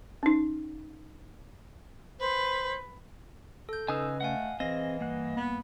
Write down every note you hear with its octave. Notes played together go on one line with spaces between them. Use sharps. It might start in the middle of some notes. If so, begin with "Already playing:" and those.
C#4 D#4
B4 C5
A4 G6
C#3 D#4 B4 D#5 G#5 D#6 E6
A3 D#5 F5 F#5 G#5
E3 C4 G#4 D#5 F5 A#6
G2 A#3 F#5
B3